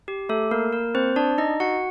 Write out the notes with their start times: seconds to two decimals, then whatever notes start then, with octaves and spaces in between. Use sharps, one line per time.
0.08 G4
0.29 A3 A4
0.51 A#3 A#4
0.72 A#3 A#4
0.95 C4 C5
1.16 D4 D5
1.38 D#4 D#5
1.60 F#4 F#5